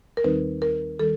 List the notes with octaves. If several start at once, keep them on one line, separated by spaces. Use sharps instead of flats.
A#4
D#2 D#3 G3 C4 D#4 B4
A#4
D#3 G3 A4